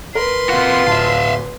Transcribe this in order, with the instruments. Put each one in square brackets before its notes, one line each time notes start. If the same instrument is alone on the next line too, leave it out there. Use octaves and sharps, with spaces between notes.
[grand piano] A#4 [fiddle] B4 C6
[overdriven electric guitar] C3 F#4 [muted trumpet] F4
[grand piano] D1 A5 [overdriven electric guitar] E5 F5